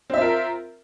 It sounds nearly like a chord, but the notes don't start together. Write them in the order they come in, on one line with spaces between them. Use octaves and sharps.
C4 E5 F4 A#4